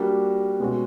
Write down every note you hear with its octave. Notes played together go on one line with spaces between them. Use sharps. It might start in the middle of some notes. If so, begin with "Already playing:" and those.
Already playing: G3 A#3 D4 F#4
B2 G#3 C#4 F#4